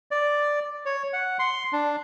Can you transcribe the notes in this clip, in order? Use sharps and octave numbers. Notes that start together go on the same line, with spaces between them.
D5
C#5
F#5
C6
D4